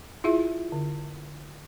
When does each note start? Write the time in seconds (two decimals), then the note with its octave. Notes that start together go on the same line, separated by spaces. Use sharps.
0.24 E4 F4 G#4 E5
0.72 D3